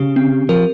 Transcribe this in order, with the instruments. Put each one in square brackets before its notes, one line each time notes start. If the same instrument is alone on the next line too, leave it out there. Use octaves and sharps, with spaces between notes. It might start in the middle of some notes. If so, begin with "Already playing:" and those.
Already playing: [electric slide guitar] C#3 [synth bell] G4
[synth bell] C4
[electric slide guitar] F3 [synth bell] A#4